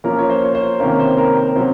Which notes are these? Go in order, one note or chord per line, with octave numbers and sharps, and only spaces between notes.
F3 A#3 C#4 A#4
C#5
C5
C#5
C5
C3 D#3 A#3 C#4 A#4
C5
A#4
A#4
C3 F#3 C#4 C5